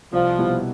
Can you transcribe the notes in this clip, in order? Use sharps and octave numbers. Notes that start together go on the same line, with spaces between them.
C2 F3
B2 G3 B3 E4